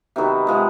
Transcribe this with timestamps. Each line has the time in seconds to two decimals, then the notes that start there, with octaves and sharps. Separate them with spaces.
0.16 C3 D#3 F#3 B3
0.47 C3 F3 G#3